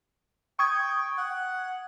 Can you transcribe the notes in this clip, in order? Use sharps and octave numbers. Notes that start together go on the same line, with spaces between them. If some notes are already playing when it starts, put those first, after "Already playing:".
G5 C#6 D#6 G#6
F#5